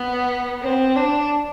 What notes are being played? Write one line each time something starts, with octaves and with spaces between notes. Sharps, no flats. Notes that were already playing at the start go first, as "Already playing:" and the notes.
Already playing: B3
C4
D4